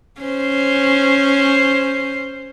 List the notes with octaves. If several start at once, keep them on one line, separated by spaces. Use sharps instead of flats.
C#4 C5